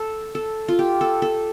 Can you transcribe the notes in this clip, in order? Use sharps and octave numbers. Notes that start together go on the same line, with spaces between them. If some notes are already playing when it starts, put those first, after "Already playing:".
Already playing: A4
A4
F4
G4
A4
A4